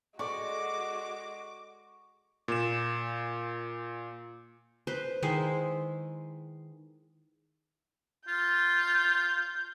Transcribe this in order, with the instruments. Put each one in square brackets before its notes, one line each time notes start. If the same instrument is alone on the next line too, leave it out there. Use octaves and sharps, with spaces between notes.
[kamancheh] G#3 F#4 [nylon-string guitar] A4 D5 [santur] C#6 [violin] D6
[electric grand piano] A#2 E7
[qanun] B4 C5
D#3 G#3 E4 C5
[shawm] F4 [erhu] G6